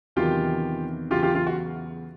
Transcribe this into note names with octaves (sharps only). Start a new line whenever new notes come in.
E2 C3 D#3 F#3 F4 G4
E2 C#3 F#3 F4 G4
F4 G4
F4
F#4